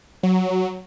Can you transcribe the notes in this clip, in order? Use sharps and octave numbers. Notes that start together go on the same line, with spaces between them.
F#3